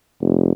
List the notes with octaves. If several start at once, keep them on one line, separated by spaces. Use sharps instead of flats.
F1